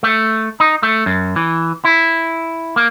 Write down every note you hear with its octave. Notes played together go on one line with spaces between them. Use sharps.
A3
D#4
A3
F#2
E3
E4
A#3